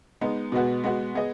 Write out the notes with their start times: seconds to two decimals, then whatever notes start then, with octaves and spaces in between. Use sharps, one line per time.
0.21 G#3 B3 D#4
0.52 B2 G#3 B3 F#4
0.84 G#3 B3 F#4
1.15 B3 G#4 D#5